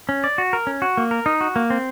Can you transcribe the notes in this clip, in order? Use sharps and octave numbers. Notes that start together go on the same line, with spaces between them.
C#4
D5
F#4
A#4
C#4
F#4
A#3
A#4
D#4
F#4
A#3
C4